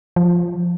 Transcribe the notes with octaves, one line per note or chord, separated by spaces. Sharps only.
F3